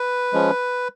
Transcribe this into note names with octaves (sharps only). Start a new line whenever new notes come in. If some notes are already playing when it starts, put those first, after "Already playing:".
Already playing: B4
F3 G#3 C#4